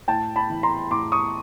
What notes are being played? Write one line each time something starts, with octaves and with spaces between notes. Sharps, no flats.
A2 G5 A5
A5 B5
E3
A#5 C6
A2 C6 D6
C#6 D#6